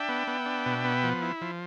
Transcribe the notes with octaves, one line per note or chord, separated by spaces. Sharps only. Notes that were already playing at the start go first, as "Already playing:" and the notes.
Already playing: D4 E5 G5
B3
B3
D4
B2
B3
F3
E4
F3